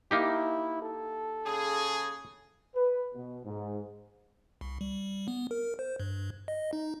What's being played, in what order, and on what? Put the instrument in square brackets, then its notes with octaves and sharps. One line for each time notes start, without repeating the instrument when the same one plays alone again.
[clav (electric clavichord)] A#3 D#4 G4 [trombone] E4
[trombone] A4
[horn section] C#3 G#4
[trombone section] B4
B2
G#2
[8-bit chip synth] C2
G3
B3
A#4
C5
G2
D#5
D#4